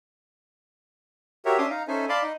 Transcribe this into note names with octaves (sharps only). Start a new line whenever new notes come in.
F#4 G4 A#4 C#5 E5
C#4 D4 E5 C6 D6 D#6
D#4 F5 A#5
C#4 D#4 A4 C5 E5 G#5
D5 F5 A5 B5 C6 D6
D#4 D#5